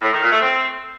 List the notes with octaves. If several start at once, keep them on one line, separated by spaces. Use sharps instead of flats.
A2
D#3
A#2
A3
C4